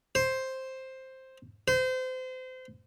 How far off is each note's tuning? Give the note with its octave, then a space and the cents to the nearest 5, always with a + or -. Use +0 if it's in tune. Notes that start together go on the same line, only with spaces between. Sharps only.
C5 +5
C5 -30